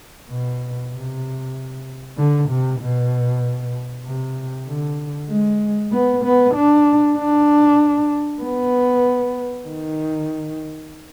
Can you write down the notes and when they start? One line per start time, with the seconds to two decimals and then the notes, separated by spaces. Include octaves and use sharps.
0.31 B2
0.93 C3
2.17 D3
2.49 C3
2.80 B2
4.05 C3
4.67 D3
5.30 G#3
5.92 B3
6.24 B3
6.55 D4
7.17 D4
8.42 B3
9.67 D#3